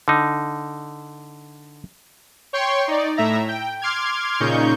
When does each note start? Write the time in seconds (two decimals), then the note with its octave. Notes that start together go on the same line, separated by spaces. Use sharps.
0.08 D3 D#4
2.53 C#5 G5 C6 C#6
2.88 D#4 D5
3.17 A2 E5 A#5
3.49 G5
3.82 C6 D6 F6 G#6
4.40 A#2 C#3 D#4 C#6 G6